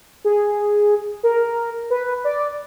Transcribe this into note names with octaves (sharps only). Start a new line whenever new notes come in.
G#4
A#4
B4
D5